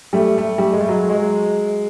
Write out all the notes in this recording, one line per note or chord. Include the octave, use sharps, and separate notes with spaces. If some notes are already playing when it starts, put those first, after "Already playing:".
G3 A3
A3
G3 A3
G#3
A3
F#3 G#3
F#3 G#3